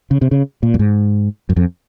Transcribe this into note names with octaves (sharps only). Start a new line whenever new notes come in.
C#3
C3
C#3
A#2
F#2
G#2
F#2
F2